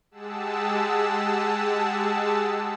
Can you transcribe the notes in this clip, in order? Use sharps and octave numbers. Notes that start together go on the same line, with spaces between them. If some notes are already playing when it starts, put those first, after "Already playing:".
G#3 G4 G#4 F#5 A5 E6